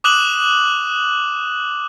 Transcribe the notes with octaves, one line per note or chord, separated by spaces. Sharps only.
D6 D#6 F#6 E7 F#7